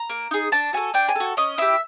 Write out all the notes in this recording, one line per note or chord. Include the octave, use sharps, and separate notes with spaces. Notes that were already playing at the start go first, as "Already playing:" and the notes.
Already playing: A#5
A#3
D#4 G#4
D4 A5
F#4 A4 G#5
D4 G5
G#5
F#4 A4
C#4 D#5
E4 G4 E5